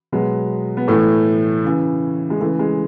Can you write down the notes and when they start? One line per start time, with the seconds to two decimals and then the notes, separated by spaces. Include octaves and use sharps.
0.12 B2 F#3 G#3 B3
0.77 B3
0.88 A2 E3 A3
1.64 C#3 E3
2.30 G#3
2.40 C#3 E3 A3
2.59 G#3